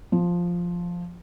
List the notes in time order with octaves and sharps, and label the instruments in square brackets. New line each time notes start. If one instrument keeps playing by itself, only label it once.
[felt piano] F3